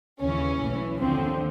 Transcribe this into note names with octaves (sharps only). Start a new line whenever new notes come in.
D#2 C#3 E3 C#4
B1 A2 E3
D#2 D3 F3 C4